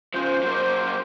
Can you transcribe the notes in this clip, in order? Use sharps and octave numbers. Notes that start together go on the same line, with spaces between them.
C#3 F3 C5
F#3 A#3